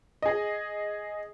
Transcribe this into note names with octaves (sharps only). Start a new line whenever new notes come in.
G#4 D#5